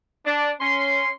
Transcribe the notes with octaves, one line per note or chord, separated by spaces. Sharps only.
D4
C#4 C6